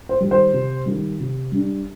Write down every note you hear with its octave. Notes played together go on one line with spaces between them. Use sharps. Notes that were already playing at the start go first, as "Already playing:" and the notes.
C5
D#3 G3
C5
C3
D#3 G3
C3
G3 D4